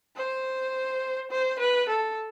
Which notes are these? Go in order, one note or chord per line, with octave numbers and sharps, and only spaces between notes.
C5
C5
B4
A4